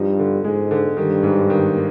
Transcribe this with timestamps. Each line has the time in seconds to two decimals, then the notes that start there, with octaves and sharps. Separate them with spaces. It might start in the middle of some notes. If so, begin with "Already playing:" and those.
Already playing: G2 F3 D#4
0.19 D3
0.44 G#2 G#3
0.71 D3
0.97 G2 D#3
1.23 G#2
1.50 D#3
1.76 A#3